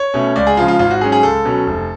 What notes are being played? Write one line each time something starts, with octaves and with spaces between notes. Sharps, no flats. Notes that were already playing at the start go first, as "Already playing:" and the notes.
Already playing: C#5
B2 A3 C#4
C#2 D5
G#4
C#3 F3 G#3 F4
F4
G#1 F4
F#4
G#2 F#3 C#4 G#4
G#4
C#2 A4
B2 F#3 C#4
F1